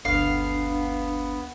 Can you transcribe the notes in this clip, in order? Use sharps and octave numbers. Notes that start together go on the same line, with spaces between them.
G1 D2 B3 D4 F5